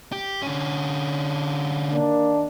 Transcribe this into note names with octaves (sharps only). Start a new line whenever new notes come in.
G4
D3 C#4
D#3 A#3 D4